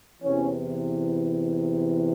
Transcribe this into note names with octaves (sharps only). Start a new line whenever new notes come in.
E2 C3 E3 C#4